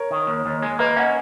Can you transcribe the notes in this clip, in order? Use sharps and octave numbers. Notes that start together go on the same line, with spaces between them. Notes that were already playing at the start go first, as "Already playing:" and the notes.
Already playing: A#4 C#5
D#3
D#2
D#2
G#3
A#3 B4 D#5
C#4 D#5 F#5